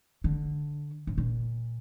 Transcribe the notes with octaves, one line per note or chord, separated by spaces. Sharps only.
D3
A2
A#2